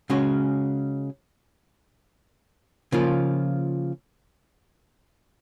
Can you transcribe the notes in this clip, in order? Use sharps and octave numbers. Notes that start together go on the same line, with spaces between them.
C#3 G#3 C#4 F#4
C#3 F3 A#3 F4